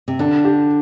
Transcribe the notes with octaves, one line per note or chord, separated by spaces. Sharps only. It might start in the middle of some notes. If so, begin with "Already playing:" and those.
C3
D3 D4
G4